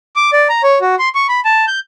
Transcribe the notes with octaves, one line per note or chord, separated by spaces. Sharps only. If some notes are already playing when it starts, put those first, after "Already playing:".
D6
D5
A#5
C#5
F#4
C6
C#6
B5
A5
G6